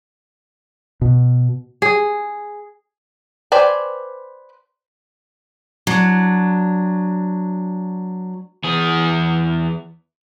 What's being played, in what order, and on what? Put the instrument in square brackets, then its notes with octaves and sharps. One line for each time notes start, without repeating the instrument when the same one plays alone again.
[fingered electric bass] B2
[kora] G#4
[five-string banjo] B4 C5 D5 G5 G#5
[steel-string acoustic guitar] F#3 D4
[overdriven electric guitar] E2 G#4